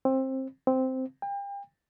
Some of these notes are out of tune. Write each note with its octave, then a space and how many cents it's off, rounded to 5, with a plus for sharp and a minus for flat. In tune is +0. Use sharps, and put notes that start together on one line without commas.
C4 +20
C4 -5
G5 +35